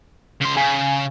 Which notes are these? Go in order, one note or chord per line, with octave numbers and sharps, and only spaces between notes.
C#3 C6
C#3 G#5